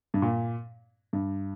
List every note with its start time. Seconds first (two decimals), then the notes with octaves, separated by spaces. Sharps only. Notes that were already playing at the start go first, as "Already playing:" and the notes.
0.14 G2
0.22 A#2
1.13 G2